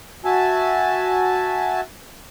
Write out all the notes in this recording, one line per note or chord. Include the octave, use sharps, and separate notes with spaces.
F#4 E5 G#5 A5